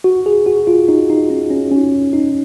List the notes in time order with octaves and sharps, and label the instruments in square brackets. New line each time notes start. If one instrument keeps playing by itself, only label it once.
[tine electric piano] F#4
G#4
F#4
F4
D#4
D#4
C#4
C#4
C#4
D#4